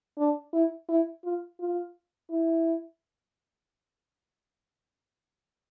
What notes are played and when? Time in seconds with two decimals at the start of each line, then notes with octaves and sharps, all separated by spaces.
0.18 D4
0.53 E4
0.89 E4
1.24 F4
1.60 F4
2.31 E4